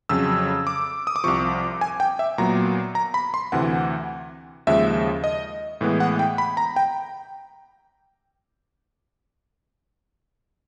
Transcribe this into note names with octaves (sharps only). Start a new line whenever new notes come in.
F2 C#3 F#3 E6
D6
D#6
D6
C2 C3 F3 C#6
G#5
G5
E5
A#2 F#3 B3 A#5
A#5
B5
C6
D2 C3 E3 F#5
D#2 C#3 F3 G#3 E5
D#5
A2 E3 G#3 B3
F#5
G5
B5
A#5
G5